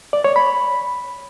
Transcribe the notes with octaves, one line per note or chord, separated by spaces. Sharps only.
D5
C#5
B5